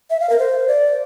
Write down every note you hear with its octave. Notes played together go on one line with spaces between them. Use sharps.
E5
F5
A#4
C5
D5